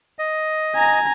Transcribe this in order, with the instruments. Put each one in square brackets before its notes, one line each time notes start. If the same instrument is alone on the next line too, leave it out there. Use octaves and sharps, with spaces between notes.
[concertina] D#5
[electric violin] G#5 A#5